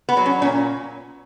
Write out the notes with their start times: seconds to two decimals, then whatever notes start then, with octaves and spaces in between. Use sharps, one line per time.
0.09 B3
0.17 F#3
0.26 C#4
0.42 A#2 C#4